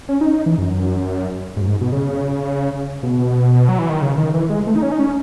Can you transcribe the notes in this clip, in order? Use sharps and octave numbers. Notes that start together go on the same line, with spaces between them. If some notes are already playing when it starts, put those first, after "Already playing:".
C#4
D#4
D#4
E3
F#2
G#2
F#2
G#2
B2
C#3
B2
F#3
E3
D#3
C#3
D#3
E3
G#3
A3
D#4
C#4
D#4
C#4